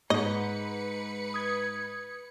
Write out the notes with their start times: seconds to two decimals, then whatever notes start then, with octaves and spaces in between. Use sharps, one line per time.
0.10 G#2 B4 D#5 C#7
1.34 D#6 G#6